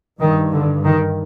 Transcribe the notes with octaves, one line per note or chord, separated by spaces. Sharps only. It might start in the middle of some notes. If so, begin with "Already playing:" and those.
G2 D#3
D3
D#3